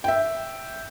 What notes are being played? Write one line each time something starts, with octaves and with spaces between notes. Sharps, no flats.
E5 G5